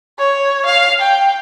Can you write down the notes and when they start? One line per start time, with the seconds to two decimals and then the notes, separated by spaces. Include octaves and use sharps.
0.19 C#5
0.66 F5
1.01 G5